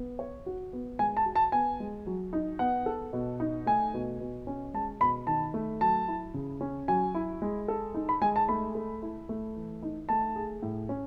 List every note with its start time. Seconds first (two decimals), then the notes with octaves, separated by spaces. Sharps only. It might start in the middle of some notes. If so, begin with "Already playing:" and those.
Already playing: B3
0.19 C#5
0.46 F#4
0.73 B3
0.99 G#3 G#5
1.17 A5
1.25 F#4
1.36 A5
1.52 B3 G#5
1.80 G#3
2.07 F#3
2.33 D#4
2.59 B3 F#5
2.86 A4
3.13 B2
3.40 D#4
3.66 A3 G#5
3.94 B2
4.20 B2
4.47 C#4
4.74 G#3 A5
5.00 B2 B5
5.27 D#3 A5
5.54 A3
5.81 F#3 A5
6.08 E4
6.34 C#3
6.61 C#4
6.88 F#3 G#5
7.15 E4
7.42 G#3
7.68 A4
7.94 D#4
8.09 B5
8.21 G#3 G#5
8.36 A5
8.49 A3 B5
8.75 A4
9.02 E4
9.29 A3
9.56 E3
9.83 D#4
10.09 A3 A5
10.36 G#4
10.63 A2
10.89 C#4